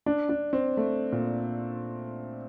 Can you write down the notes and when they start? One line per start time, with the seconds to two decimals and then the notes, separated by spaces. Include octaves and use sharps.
0.06 D4
0.29 D4
0.53 C4
0.77 A3
1.12 A#2